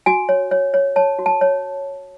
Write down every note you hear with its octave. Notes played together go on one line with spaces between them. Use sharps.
F#4 G#5
C#5
C#5
C#5
C#5 A5
F#4
A5
C#5